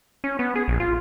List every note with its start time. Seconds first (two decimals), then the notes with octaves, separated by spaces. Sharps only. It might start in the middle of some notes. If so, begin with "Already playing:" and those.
0.24 C#4
0.39 B3
0.56 G#4
0.68 A#1
0.80 F4